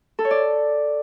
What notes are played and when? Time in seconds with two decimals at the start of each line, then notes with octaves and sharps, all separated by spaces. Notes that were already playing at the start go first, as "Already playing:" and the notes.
0.19 A4
0.25 C#5
0.31 D5